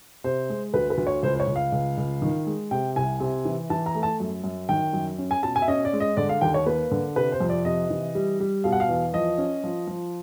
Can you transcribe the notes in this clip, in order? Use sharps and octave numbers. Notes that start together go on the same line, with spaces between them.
C3 C5
G#3
D2 B4
B4
D2
C#5
C#2 C5
C5
C#5
C#2
F5
C#2
C#2
D#3
G#3
C3 G5
C2 G#5
C3
E3
E3 A5
A#5
A3
A5
F#2
F#2
D#3 G5
F#2
C#4
G#5
B2 A5
G#5
E5
C#4 D#5
D5
G#3
D#5
D3 D5
F5
D#2 G5
C#5
A#3 B4
D3
C3 B4
C5
F2
D5
C3 D#5
E3
G3
G3
B2 F5
F#5
F5
E2
F3 D#5
C#4
F3
F3